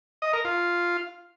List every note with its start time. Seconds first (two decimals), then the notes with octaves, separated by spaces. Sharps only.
0.22 D#5
0.33 A#4
0.45 F4